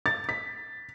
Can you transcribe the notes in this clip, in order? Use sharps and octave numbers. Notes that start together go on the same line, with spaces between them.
A6
B6